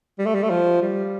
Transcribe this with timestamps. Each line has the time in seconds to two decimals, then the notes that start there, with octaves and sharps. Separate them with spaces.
0.19 G3
0.26 A3
0.35 G3
0.43 A3
0.50 F3
0.82 G3